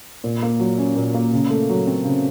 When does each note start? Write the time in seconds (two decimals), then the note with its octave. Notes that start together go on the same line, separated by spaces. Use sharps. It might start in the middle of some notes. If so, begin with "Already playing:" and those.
0.24 A#2
0.43 A#3
0.60 F#3
0.78 C#4
0.96 A#2
1.14 A#3
1.33 C#3
1.50 A3
1.69 F#3
1.87 C4
2.05 C#3